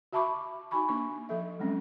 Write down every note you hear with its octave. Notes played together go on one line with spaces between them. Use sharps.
F#4 E5 A5 B5 C#6 D6
D#4 F#4 G#5 B5 C#6
A#3 D4 C#6
F3 A4 E5
F#3 G#3 C4 C#4